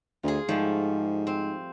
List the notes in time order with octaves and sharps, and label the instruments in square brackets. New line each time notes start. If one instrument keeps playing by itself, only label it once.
[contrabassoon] D2 [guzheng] F4 G#4
[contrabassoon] G#2 [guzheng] F3 G3 A3
[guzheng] C4